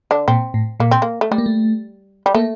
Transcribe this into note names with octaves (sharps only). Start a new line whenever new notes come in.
D3 D4
A#2 C4
A2
A#2 A#3
C4
A#3
A3
G3 A3
A#3
A3
G3
A3 A#3